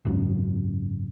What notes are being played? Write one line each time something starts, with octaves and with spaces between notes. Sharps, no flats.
G#1 C#2 F#2